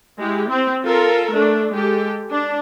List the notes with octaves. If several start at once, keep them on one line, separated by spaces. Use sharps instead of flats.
G#3 E4 G4
C4
F4 A4 A#4
A3 D4
G#3 G4 A4
D4